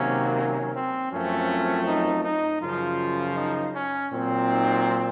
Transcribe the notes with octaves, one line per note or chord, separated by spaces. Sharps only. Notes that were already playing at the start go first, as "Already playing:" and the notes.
Already playing: C3 D#3 F#3 A#3 C#4
C#4
C4
F#2 F3 A3 C4 C#4
D#4
D#4
F#2 C#3 F3 F4
D#4
C#4
A#2 F#3 C4
D#4